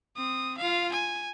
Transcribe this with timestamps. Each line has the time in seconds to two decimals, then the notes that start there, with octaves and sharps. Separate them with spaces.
0.17 C4 D#6
0.58 F4 F5
0.92 G#5